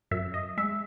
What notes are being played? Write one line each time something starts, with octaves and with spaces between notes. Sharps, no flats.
F#2 E5
D#5
G#3 E5